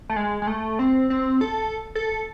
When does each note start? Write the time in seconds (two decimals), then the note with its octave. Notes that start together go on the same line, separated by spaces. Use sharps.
0.10 A3
0.16 G#3
0.42 G#3
0.47 A3
0.79 C4
1.10 C4
1.41 A4
1.95 A4